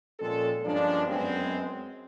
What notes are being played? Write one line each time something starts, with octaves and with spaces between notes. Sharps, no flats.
A#2 F3 G#3 C4 C#4 A4
G2 F3 G#3 A#3 C#4 D4
F#2 G#3 B3 C4